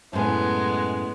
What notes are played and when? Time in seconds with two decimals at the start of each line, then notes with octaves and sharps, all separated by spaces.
0.13 F#2 A2 G#3 B3 G#5